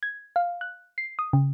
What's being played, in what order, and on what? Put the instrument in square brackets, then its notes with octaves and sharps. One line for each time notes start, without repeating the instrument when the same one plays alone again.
[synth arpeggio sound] G#6
F5
F#6
C7
D#6
C#3